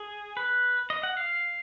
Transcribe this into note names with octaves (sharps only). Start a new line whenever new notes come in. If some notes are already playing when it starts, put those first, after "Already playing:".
Already playing: G#4
B4
D#5
F#5
F5